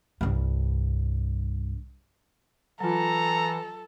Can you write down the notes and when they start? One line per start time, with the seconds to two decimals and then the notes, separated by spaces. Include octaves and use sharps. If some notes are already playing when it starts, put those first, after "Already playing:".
0.21 C2 G2
2.81 E3 F#3 F4 A4 A#5